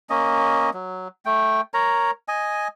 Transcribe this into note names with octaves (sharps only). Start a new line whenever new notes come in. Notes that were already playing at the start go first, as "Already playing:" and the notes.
A#3 C#4 D#5
F#3
A3 G5
A#4 C#5 A#5
D#5 G#5